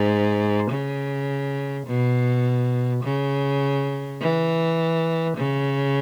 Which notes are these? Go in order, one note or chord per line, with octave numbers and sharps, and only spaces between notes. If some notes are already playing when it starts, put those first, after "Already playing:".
Already playing: G#2
C#3
B2
C#3
E3
C#3